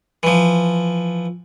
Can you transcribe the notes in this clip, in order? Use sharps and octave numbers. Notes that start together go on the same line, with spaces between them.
E3 F3